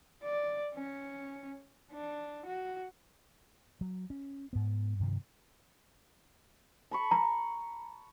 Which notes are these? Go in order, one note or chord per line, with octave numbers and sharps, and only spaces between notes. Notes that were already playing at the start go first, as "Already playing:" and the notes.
D5
C#4
D4
F#4
F#3
C#4
G#2 B3
G2 C3 D#3 F3
A5 B5 C#6
A#5